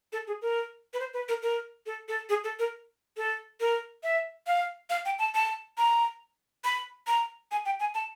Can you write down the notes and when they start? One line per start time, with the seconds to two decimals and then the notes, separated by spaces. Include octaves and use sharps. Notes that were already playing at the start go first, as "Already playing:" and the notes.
0.13 A4
0.27 G#4
0.42 A#4
0.94 B4
1.00 C5
1.14 B4
1.29 A#4
1.42 A#4
1.86 A4
2.08 A4
2.29 G#4
2.44 A4
2.59 A#4
3.17 A4
3.60 A#4
4.03 E5
4.47 F5
4.90 F5
5.05 G5
5.19 A5
5.34 A5
5.78 A#5
6.64 B5
7.07 A#5
7.51 G#5
7.66 G5
7.80 G#5
7.95 A5